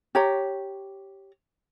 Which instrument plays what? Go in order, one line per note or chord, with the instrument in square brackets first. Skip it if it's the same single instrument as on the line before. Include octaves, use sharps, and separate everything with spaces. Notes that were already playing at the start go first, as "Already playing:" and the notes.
[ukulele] G4 C#5 A#5